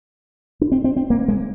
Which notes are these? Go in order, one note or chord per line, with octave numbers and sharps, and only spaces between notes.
D4
C4
C4
C4
A#3
G#3